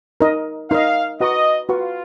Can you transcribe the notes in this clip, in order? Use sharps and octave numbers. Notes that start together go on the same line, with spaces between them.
D#4 A#4 D#5
D#4 A#4 D#5 F5
F#4 B4 D#5 F#5 A#5 C#6
F4 F#4 B4 F#5 A#5 C#6